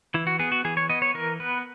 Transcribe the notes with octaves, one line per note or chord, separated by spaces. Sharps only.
E3 E4
F#4
B3 G#4
F#4
E3 G#4
C#5
B3 D#5
C#5
E3 A#4
B3 B4